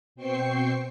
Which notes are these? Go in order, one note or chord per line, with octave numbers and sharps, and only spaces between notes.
B2 C4 C5 G5 C#6 C7